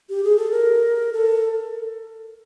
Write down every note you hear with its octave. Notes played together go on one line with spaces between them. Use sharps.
G4
G#4
A4
A#4
A4